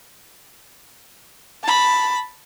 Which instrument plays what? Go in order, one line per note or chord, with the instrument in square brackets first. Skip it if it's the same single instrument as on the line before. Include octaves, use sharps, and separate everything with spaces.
[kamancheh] A5 B5